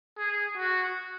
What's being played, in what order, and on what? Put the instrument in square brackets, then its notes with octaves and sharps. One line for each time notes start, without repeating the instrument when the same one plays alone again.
[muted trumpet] G#4
F#4